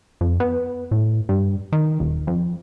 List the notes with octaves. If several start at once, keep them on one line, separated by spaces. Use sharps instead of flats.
F2
B3
A2
G2
D#3
D#1
F2